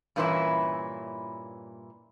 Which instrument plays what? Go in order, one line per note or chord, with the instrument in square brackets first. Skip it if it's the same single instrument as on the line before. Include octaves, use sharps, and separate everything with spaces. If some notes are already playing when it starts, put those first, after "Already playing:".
[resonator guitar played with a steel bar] G2 A#2 E3 A#3 C#4 E4